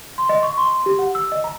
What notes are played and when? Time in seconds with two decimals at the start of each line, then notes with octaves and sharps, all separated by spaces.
0.18 C6
0.29 D#5
0.43 C#6
0.57 C6
0.86 G4
0.99 F#5
1.15 E6
1.32 D#5
1.44 A#5